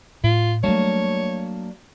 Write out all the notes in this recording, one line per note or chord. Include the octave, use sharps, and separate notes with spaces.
A2 F4
F#3 G3 A3 A#3 D4 C#5